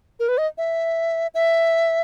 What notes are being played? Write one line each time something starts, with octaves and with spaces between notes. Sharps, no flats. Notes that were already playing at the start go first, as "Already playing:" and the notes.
A#4
B4
D#5
E5
E5